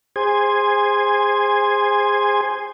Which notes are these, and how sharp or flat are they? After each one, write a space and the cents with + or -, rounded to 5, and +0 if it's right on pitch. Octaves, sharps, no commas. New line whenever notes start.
G#4 -20 C5 +0 G#5 +0